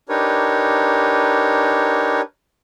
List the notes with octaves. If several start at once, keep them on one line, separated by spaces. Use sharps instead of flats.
D4 D#4 G4 A#4 B4 C#5